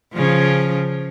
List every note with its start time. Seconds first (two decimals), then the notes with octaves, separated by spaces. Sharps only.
0.14 C#3 F3